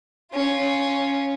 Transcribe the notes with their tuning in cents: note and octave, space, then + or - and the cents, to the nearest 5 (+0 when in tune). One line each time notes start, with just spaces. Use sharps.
C#4 +0 F4 +0